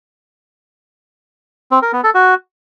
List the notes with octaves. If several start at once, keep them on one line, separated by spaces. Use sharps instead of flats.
C4
A#4
B3
A4
F#4